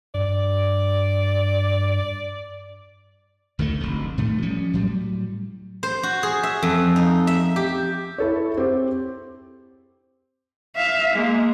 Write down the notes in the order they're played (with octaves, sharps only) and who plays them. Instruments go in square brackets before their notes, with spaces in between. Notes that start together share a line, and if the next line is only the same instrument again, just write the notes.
[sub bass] G2 [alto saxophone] D5
[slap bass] D2 D#3 E3 A3
F1 D2
A2 D#3 A3
F3 G3 C#4
A2 F#3 G3
[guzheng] C5
F#4
G#4
E5
F2
D#4
E5
G4
[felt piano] E4 A4 C#5
C4 G4
[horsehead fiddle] E5 F5
G#3 A#3